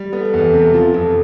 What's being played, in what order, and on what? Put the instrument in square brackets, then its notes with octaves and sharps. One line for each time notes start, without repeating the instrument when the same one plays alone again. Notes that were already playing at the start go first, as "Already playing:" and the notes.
Already playing: [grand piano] G3
[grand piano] B3 [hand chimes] A4
[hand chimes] B4
[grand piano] E2
[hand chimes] A4
[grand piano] C3
F3
[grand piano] F2 [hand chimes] A4